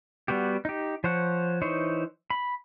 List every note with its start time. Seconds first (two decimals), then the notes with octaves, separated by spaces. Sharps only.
0.28 G3 B3 F#4 G4
0.65 D#4 G4
1.04 F3 C5 C#5 F#5
1.62 E3 D#4 C5 C#5
2.30 B5